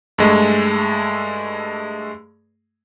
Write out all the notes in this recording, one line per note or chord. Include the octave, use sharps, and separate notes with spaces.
G2 G#3 A3